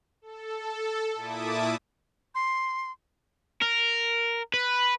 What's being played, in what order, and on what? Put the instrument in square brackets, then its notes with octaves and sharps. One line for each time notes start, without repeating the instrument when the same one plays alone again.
[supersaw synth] A4
A#2 E4 E5 A5 D6 D#6
[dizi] C6
[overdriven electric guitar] A#4
B4